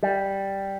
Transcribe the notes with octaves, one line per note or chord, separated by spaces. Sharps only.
G3